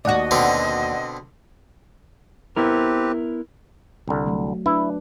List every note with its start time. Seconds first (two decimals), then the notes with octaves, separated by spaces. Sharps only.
0.05 D#2 F#4 D5 D#5 F#5
0.31 B2 D3 C4
2.56 B3 C4 E4 G4 A#4 B4
4.08 C2 D3
4.26 F#3 A3
4.66 D4 E4 B4